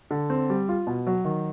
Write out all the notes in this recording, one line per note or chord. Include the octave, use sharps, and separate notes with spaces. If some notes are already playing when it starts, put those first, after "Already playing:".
D3
C4
G3
F4
B2
F#3
D#3